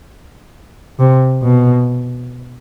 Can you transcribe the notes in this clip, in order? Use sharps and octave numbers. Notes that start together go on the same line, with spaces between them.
C3
B2